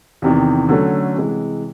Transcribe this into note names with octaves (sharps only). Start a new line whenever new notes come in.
E2 C3 D#3
D3 F#3 A3 C#4
C3 E3 G#3